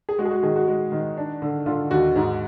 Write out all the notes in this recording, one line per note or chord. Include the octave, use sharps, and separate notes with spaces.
G#4
G#3 F#4
G#4
F#4
D#3 G#4
F#4
G#3
D#3
D4
D3
D3 F4
D#2 F#4
G#2